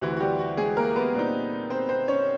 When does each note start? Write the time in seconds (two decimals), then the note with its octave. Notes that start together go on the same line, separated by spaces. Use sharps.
0.01 D2 C3 E3 F#4
0.17 F#4
0.20 G3 G4
0.39 F#4
0.57 G#3 G#4
0.77 A#3 A#4
0.96 B3 B4
1.14 A#2 G3 C4 D#4
1.70 C4 C5
1.89 C4 C5
2.08 C#4 C#5